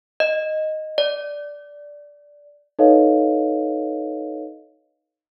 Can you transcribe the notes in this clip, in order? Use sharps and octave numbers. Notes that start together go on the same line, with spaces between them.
D#5
D5
D#4 A4 B4 C#5 D#5 F5